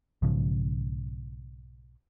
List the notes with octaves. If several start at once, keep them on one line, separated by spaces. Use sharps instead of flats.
B1 G#2 C#3 F3